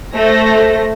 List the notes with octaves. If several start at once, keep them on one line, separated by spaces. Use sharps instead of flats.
A3 C5 A#6